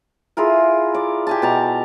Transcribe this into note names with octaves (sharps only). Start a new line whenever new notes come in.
E4 F4 G#4 A#4
D5
G4 G#5 A5
B2 A5 A#5